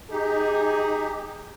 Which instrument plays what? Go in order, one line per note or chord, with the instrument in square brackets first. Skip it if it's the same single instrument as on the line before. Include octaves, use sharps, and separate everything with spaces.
[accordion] D#4 G4 [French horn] G#4